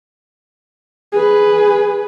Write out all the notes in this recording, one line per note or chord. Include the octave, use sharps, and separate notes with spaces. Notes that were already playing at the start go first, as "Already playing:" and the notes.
G#4 B4